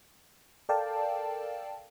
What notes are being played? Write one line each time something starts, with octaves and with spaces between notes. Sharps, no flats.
A4 A#4 D5 F5 G5 A5